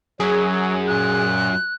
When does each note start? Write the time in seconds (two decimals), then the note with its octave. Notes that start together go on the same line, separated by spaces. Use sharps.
0.20 F#2 F#3 G#4
0.87 A#2 F#6